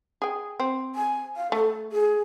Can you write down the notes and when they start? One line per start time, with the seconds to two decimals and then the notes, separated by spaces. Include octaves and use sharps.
0.22 G#4 G5
0.60 C4
0.95 G#5
1.36 F5
1.52 A3 A4
1.92 G#4